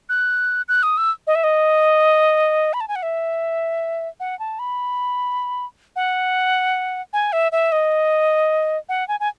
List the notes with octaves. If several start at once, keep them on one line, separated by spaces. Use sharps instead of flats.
F#6
F#6
D#6
E6
D#5
E5
D#5
B5
A5
G#5
F#5
E5
F#5
A5
B5
F#5
G#5
E5
E5
D#5
F#5
G#5
G#5